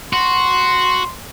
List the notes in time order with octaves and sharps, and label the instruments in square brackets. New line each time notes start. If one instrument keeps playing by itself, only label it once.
[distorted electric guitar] F#4 [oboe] C6